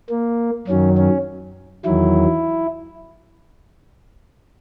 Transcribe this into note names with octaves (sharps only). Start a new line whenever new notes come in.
A#3
F#2 D#3 F#3 C#4
C#4
E2 D#3 F#3 E4